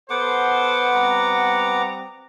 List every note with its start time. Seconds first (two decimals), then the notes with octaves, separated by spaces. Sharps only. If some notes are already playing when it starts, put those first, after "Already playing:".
0.10 B3 A4 C5 F#5 D6
0.95 G3 C4 A#5